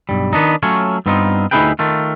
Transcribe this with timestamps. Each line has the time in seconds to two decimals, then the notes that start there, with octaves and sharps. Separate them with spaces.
0.09 B1 G2 G3
0.33 D#3 B3 D4 D#4
0.63 F#3 A3 C#4 F4 C#5
1.06 G2 B3 C4 D#4 F4
1.51 D2 D#4 E4 G#4 B4 G5
1.79 D#3 A3 F4